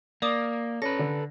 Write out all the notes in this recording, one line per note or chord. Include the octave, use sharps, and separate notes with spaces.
A#3 D5 D6 D#6
C#4 A4 B4 A#6
D3